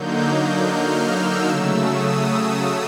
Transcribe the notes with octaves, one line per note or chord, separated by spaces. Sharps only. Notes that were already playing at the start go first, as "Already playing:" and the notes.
Already playing: D3 F#3 A#3 D#4 G6
F6
E6
C#3 F#3 A3 E6
D#6
D#6